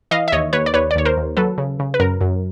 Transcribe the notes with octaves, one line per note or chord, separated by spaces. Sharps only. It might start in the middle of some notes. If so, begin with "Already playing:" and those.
E3 D#5 F5
E5
D#2 C#5 D#5
D#2 B4 C#5
D5
D#2 B4 C#5
D5
D#2 C#5
A#4 C5
D#2
F#3 A4 B4
C#3
C#3
B4
F#2 A#4
F#2